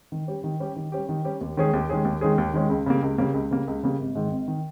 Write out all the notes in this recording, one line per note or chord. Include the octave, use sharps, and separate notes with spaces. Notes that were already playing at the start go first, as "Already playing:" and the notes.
D#3
G3 C#4 G4
D#3
G3 C#4 G4
D#3
G3 C#4 G4
D#3
G3 C#4 G4
D#2
D#3 G#3 C#4 G#4
D#2
D#3 G#3 C#4 G#4
D#2
D#3 G#3 C#4 G#4
D#2
D#3 G#3 C#4 G#4
C#2
C#3 G3 A#3
C#2
C#3 G3 A#3
C#2
C#3 G3 A#3
C#2
C#3 G3 A#3
G#1
G#2 D#3
G#1
D#3